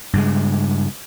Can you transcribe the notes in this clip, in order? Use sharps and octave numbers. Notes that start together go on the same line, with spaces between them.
G2 C#3 G#3